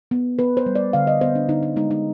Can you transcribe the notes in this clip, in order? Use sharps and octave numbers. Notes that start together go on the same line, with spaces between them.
B3
B3 B4
C5
G3
D5
D3 F5
D#5
B3 C5
D4
D3 D#4
D#4
G#3 D#4
D#4